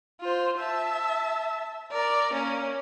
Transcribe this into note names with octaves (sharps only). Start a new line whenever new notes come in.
F4 C5
E5 A5
A#4 D5
A#3 C#4